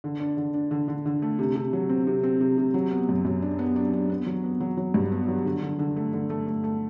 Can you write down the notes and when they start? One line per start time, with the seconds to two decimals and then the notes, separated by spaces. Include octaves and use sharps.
0.04 D3
0.20 D4
0.37 D3
0.54 D4
0.71 D3
0.88 D3
1.06 D3
1.22 A3
1.39 C3
1.56 C3
1.73 F#3
1.89 C4
2.07 C3
2.23 C4
2.41 C3
2.58 C3
2.74 F#3
2.91 B3
3.09 F#2
3.25 F#2
3.42 D4
3.59 B3
3.76 D4
3.93 D4
4.10 B3
4.27 F#3
4.44 B3
4.60 F#3
4.77 F#3
4.94 G2
5.12 B3
5.28 F#3
5.45 D3
5.62 D3
5.79 D3
5.96 A3
6.13 D3
6.30 A3
6.47 A3
6.64 A3